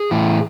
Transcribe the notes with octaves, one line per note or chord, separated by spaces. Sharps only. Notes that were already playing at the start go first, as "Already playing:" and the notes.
Already playing: G#4
A2 E3